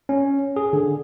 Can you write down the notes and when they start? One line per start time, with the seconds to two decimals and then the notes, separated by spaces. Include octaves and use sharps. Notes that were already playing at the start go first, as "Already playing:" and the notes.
0.09 C#4
0.56 G#4
0.73 D3